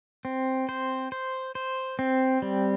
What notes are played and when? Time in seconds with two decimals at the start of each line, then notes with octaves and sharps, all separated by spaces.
0.25 C4
0.69 C5
1.12 C5
1.55 C5
1.99 C4
2.42 G3